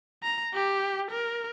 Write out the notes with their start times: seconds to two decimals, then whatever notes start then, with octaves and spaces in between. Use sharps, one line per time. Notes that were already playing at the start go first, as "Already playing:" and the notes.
0.23 A#5
0.54 G4
1.11 A#4